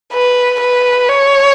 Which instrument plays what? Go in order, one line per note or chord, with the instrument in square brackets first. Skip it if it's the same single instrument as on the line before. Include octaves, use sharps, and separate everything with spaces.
[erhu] B4
B4
C#5